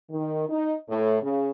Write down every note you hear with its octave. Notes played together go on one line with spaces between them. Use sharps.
D#3
D#4
A2
C#3